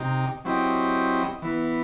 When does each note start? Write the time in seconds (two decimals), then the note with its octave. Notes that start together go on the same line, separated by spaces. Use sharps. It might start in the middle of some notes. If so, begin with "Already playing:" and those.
Already playing: C3 D#4 G4
0.45 F#3 C4 E4 G4 D#5
1.42 E3 B3 E4